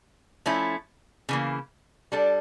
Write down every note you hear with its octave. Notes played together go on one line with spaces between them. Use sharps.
F3 A3 C#4 E4
C#3 E3 A#3
G3 D4 A4